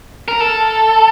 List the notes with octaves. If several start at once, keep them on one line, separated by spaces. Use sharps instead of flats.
A#4
A4